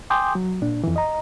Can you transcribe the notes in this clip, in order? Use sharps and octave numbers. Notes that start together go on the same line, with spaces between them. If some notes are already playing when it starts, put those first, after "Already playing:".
G5 G#5 C6 D6 D#6 G6
F#3
A#2 D4
F2 E3
D#5 A#5